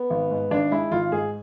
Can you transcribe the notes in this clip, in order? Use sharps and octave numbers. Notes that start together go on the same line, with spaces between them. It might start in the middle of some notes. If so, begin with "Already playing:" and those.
Already playing: B3
G#1
G#2
G#1 D4
G#3 E4
G#1 F4
G#2 G#4